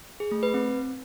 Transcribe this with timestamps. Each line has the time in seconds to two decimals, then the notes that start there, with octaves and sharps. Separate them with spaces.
0.20 G#4
0.31 A3
0.43 B4
0.54 C4